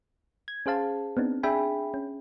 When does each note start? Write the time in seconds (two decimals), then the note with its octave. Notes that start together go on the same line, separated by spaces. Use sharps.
0.48 G#6
0.66 C#4 G#4 C5 F5 A5
1.17 B3 C4 D4 D#4
1.43 D4 G#4 E5 G5 G#5 B5
1.94 C#4